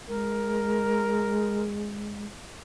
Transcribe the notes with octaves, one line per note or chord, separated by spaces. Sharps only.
G#3 A#4